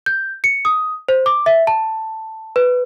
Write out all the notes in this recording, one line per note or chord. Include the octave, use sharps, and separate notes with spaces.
G6
C#7
D#6
C5
D6
E5
A5
B4